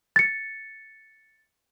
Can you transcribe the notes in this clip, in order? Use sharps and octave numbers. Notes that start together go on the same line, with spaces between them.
A6 C#7